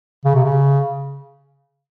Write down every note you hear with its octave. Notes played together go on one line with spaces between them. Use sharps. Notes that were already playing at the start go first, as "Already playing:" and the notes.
C#3
C3
C#3